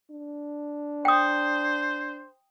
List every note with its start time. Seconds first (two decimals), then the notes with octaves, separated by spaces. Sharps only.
0.11 D4
1.05 C5 G5 D#6